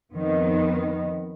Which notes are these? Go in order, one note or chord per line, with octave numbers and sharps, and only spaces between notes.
F2 D#3 B3 D#4